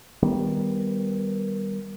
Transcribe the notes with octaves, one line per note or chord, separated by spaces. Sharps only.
D#3 G3 B3